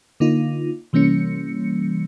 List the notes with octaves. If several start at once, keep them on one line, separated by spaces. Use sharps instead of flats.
D3 A#3 D#4 F4
C3 E3 G3 A#3 C#4 C#7